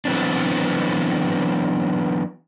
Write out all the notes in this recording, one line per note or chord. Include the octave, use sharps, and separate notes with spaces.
E3 F#3 B3 C4 D4